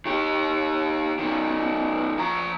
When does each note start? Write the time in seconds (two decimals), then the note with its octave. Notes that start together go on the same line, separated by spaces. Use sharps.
0.05 D#3 G4
1.19 B2 D#3
2.18 F3 A#5